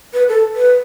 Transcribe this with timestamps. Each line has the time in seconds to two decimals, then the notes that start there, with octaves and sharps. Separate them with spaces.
0.14 B4
0.29 A4
0.56 B4